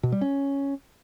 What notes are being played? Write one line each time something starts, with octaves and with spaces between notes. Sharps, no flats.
B2
G3
C#4